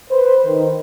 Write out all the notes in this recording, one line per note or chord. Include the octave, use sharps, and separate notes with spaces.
B4 C5
D#3